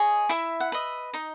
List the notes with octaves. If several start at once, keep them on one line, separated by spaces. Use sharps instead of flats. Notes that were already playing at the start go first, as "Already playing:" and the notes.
Already playing: G#4 C#5 D#5
E4 E5
F#5
B4 D#5 E5
D#4 D#5